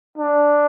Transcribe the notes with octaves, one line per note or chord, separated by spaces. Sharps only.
D4